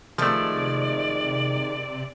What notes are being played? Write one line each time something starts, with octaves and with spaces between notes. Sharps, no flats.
C3 D#3 F3 G#3 A3 D5